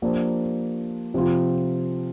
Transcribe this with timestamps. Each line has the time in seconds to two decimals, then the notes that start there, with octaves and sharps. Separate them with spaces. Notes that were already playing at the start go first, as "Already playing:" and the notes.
0.02 F3 A#3 D4 G4 C5
1.14 C3 F3 C4 F4